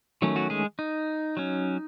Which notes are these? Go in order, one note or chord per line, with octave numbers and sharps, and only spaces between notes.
D#3 F#3 A3 C#4
F#3 F#4
G#3 G#4
D#4
F#3 C#4